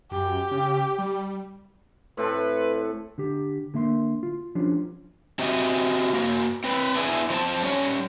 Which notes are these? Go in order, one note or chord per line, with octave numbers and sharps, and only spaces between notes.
F#2 G4
C#3
G3
A2 C4 A4 B4
D3 G4
D3 A#3 E5 C6
F4
F3 G3 C#4 D4 F4
C4 F#4 G4 D#5 E5 G#5
A#3 F#4
C4 B4
B3 D4 E4 F4 G#4
F3 C4 B4 A5
G3 C#4 C#5